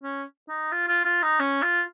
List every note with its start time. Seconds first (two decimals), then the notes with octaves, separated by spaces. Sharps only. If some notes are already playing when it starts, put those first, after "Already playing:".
0.03 C#4
0.49 D#4
0.71 F4
0.88 F4
1.05 F4
1.22 D#4
1.39 C#4
1.62 F4